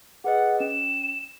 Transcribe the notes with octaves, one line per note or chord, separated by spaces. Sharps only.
G#4 B4 D#5 F#5
C#4 E7